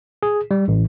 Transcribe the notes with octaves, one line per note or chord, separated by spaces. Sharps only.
G#4
G3
A1